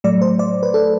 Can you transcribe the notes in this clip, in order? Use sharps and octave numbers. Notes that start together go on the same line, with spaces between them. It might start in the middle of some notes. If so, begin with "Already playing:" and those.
A2 F#3 A3 D5
C5
D5
B4
A4